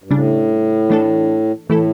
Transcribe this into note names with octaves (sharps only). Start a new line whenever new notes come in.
G2
A2 C#3 G3 D4
E3 A3 D4 A4
A2 E3 A3 E4 A4